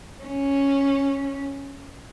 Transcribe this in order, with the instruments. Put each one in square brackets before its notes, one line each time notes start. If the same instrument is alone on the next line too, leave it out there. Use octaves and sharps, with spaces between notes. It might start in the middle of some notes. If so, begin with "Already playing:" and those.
[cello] C#4